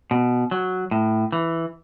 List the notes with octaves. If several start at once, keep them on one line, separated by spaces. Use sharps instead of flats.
B2
F#3
A2
E3